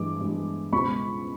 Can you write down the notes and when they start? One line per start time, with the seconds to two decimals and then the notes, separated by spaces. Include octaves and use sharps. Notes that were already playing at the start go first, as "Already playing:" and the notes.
Already playing: G2 E3 G#3 D6
0.21 G2 E3 G#3
0.72 C#2 B2 G#3 B5 C#6